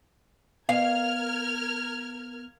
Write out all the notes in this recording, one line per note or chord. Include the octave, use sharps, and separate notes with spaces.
B3 A#4 F5 F6 G#6